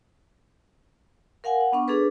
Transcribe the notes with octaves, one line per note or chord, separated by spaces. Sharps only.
A#4 F5 F#5 G#5
F#5
B3 D4 C#6
D4 G#4 A4 B4